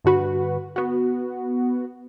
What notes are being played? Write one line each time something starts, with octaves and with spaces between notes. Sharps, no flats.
G2 D3 F#4 B4
B3 F#4